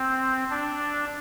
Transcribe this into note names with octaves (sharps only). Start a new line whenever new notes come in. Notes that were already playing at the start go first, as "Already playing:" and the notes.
Already playing: C4
D4